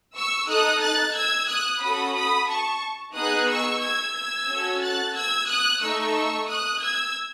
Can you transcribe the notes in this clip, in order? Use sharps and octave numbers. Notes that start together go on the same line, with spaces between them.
C#6 E6
D#4 A4 D#6 F#6
F#6 A6
E6 G#6
D#6 F#6
C#4 F#4 A4 B5 D#6
B5 D#6
A5 C#6
B3 D#4 G#4 D#6 F#6
C#6 E6
E6 G#6
E6 G#6
C#4 F#4 A4
F#6 A6
E6 G#6
D#6 F#6
A3 D#4 A4 C#6 E6
D#6 F#6
E6 G#6